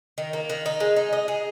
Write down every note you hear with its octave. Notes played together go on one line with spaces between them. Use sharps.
D#3
A#3
D#3
D#4
G#3
D#4
D#5
G#4